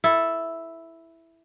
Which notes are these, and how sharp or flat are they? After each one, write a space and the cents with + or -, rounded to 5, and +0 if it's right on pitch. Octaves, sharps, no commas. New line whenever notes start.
E4 +0 A4 +0